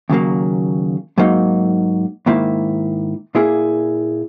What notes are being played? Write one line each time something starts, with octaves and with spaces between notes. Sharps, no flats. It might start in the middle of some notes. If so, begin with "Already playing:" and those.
D#2 C#3 F#3 A#3
G#2 F#3 A#3 D#4
G#2 D#3 A#3 E4
A#2 A#3 E4 G#4